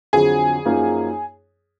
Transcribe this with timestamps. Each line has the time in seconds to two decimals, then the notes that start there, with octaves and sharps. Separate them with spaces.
0.13 F2 D3 F#3 G#4
0.65 F#2 F3 A#3 D#4